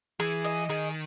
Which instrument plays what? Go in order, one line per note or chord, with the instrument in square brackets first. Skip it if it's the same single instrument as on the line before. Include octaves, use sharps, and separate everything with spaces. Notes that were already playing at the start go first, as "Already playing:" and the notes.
[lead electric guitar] E3 [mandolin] G#4
[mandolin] D#5
[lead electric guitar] D#3 [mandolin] G#4